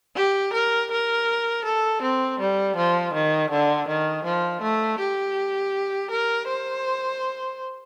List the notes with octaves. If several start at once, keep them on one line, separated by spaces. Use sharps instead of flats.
G4
A#4
A#4
A4
C4
G3
F3
D#3
D3
D#3
F3
A3
G4
A#4
C5